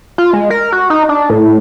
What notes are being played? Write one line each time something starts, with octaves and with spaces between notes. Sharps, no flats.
F4
G#3
A#4
F#4
D#4
D4
A2